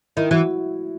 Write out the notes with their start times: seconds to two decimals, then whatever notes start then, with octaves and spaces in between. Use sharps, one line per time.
0.17 D#3 E4
0.31 E3 F#4